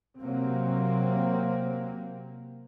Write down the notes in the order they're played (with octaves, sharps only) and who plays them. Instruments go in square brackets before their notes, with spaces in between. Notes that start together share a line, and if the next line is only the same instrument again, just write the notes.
[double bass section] C3 F#3 A#3 C4